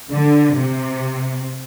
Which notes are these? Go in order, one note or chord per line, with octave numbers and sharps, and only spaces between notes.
D3
C3